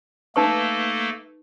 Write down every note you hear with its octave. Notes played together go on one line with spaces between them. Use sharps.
A3 A#3 D#4 A4 B4 C#6